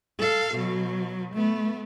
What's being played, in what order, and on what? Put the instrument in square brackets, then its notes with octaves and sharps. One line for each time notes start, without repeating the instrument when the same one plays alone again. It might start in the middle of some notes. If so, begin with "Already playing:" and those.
[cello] A4 F5
B2 F#3
A3 B3